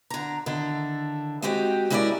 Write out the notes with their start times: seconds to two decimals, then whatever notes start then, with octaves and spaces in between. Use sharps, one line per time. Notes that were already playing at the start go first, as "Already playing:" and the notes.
0.10 D3 A#5
0.46 D3 D#3 E4 A4
1.42 G#3 C4 D#4 F#4 G4
1.90 G#3 C#4 E4 A#4 C#5 D5